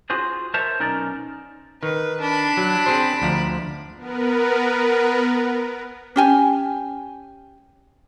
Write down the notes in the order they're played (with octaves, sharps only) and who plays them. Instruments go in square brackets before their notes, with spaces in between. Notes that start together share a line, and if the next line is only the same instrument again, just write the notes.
[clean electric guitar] F4 F#4 G#4 C5
A#4 C5 C#5 E5 A5
B1 C#4 D#4 A#4 D5
[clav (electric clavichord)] D#3 [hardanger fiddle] B4
[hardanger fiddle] D4 B5
[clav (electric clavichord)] F#3
C4 G#4 C5
D2 F3 A#5
[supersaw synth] B3 A#4 B4
[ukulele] C#4 G4 G#5